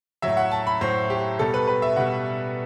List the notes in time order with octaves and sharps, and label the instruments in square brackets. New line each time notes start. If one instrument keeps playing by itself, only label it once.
[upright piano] A2 F#3 E5
F#5
A5
B5
A2 F#3 C5
G4
B2 G3 A4
B4
B4
E5
B2 G3 F#5